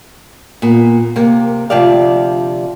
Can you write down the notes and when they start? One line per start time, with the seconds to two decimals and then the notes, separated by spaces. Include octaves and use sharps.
0.62 A#2 A#3 B3
1.16 C3 A#3
1.70 D2 C3 F3 G4 D5 F5